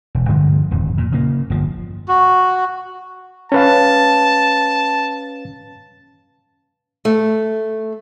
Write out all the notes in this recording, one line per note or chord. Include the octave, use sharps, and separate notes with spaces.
E1
G2 D3 F3 G#3
D#1 F2
A#2
C#3 A#3
G1 F3
F#4
C#4 B4 F5 A5
A3